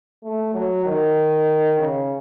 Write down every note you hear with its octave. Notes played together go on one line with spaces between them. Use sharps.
A3
F#3
D#3
C#3